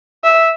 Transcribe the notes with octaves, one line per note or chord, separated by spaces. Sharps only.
E5